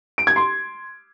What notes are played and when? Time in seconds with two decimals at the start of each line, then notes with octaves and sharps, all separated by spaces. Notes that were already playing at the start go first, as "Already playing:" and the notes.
0.18 D7
0.27 G#6
0.36 C6